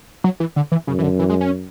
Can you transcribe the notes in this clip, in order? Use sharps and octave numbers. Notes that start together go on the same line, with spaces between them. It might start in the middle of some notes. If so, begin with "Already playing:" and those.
F#3
E3
D3
E3
F#2 C#3
E3
D3
E3
G#3
C#4